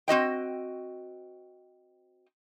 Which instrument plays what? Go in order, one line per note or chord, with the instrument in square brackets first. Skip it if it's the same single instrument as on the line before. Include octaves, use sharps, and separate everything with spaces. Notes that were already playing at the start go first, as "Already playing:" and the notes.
[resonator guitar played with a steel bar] C4 F#4 D#5 G5